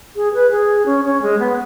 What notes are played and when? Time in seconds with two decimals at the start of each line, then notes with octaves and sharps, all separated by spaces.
0.16 G#4
0.34 B4
0.51 G#4
0.86 C#4
1.05 C#4
1.22 G#3
1.40 B3